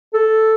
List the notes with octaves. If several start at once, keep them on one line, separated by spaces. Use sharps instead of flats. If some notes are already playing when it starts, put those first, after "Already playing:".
A4